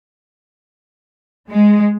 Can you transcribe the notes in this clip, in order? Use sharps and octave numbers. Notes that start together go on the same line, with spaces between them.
G#3